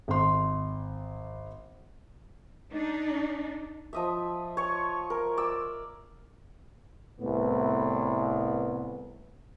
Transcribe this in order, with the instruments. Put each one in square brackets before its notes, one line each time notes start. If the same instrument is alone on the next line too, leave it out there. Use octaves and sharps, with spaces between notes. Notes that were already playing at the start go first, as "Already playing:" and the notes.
[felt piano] G#1 C6
[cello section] D4 D#4
[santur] F3 D#5 E5
C#5 C#6
A#4
D5 E6
[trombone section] C2 A2 B3